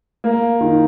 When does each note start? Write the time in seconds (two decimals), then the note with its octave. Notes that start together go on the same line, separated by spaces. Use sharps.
0.24 A#3
0.61 D#3